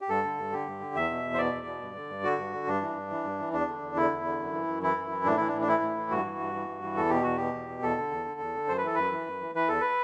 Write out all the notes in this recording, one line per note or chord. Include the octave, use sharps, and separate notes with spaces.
G4
G2 A4
D3
G2
D3 G4
G2
D3
E2 E5
B2
E2
C5
B2 D5
E2
B2
G2
D3
G2
D3 F#4
G2
D3
G2 D4
E3
G2
E3
G2
E3
E2 D4
D3
E2
D3 E4
E2
D3
F#2
E3
F#2
E3 E4
F#2
E3
A2 D4
E3 E4
D4
A2
D4
E3 E4
A2
E3
G2 F#4
E3
G2
E3
G2
E3
E2 A4
B2 G4
E2 F#4
B2 G4
E2
B2
E2 A4
D3
E2
D3
E2
D3
F#2 C5
B4
E3 A4
F#2 B4
E3
F#2
E3
E3 B4
E2 A4
B4